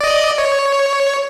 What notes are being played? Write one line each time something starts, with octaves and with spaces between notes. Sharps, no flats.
D5 D#5
C#5